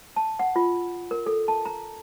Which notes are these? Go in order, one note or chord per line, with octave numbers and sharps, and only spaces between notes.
A5
F#5
F4
A#4
A4
A5
A#5